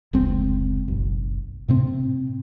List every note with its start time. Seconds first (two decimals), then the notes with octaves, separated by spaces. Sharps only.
0.13 F1 C#2 G#3 C4
0.88 F#1 B1
1.68 A2 C3 C4